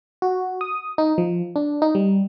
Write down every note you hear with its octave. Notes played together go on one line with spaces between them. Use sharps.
F#4
D#6
D#4
F3
D4
D#4
G3